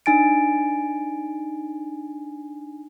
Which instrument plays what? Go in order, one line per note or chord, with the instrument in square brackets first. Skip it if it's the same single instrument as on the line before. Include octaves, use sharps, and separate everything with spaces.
[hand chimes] D4 D#4 G#5 A6 D7